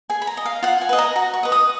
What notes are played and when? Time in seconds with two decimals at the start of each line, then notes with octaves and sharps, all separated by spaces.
0.10 G#4 G#5
0.22 B5
0.27 A#5
0.37 D#5
0.46 F5
0.63 F4 F#5
0.81 G#5
0.89 B4 D#5
0.99 A#5
1.16 F#4 A#5
1.34 C#6
1.43 B4 D#5
1.52 D#6